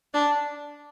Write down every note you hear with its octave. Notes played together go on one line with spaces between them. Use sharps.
D4